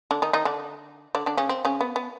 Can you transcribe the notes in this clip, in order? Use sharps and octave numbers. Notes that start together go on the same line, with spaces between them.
D3 D4
D#3 D#4
D#3 D#4
D3 D4
D3 D4
D3 D4
C#3 C#4
C4
C#3 C#4
B3
B3